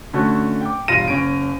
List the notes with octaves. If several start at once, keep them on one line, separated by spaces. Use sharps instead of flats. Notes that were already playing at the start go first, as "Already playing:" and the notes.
D3 A3 C#4 F#4
G5 D6
E1 G2 F4 A#6 D#7
F#1 C#4 D7